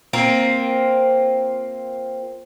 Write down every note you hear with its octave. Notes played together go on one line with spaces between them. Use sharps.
A#3 C4 F4